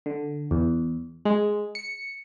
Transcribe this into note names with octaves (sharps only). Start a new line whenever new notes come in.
D3
E2
G#3
C#7